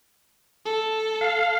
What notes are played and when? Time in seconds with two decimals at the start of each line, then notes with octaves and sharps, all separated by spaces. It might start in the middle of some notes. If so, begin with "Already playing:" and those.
0.65 A4
1.21 F5